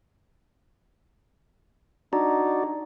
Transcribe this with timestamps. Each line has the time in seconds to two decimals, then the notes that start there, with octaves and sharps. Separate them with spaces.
2.13 D4 D#4 F#4 D5 A#5